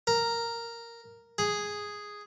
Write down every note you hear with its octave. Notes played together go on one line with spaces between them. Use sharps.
A#4
G#4